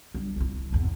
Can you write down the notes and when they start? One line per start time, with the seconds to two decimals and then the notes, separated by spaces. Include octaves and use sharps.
0.14 G3 D4
0.36 C2 E4
0.72 G#1 E2